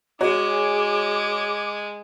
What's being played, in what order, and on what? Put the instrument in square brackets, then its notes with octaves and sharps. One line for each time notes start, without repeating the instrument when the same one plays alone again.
[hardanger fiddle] G#3 [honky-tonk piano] F#4 C#5 [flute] G#4 [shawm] D6